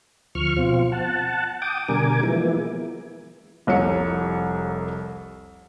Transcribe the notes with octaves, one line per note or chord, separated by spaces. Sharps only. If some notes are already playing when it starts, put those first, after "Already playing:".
D2 F3 C#6 F6
B2 F3 C4 F4
F#5 A5
G5 D6 D#6
B2 D3 G3 A#4 G#5 D6
E3 F3 G#3 A#3 B3 E4
F1 C2 C#5 C#7